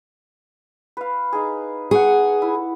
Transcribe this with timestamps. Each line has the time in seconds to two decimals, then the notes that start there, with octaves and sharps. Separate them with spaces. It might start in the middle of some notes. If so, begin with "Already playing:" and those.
0.97 B4 F5
1.33 D#4 G#4
1.91 G#4 F#5 C#6
2.42 E4